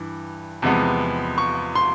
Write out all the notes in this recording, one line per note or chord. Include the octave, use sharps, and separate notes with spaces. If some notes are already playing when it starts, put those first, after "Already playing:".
Already playing: G2 E3
E2 C3 F3 G#3 B3
C#6
C6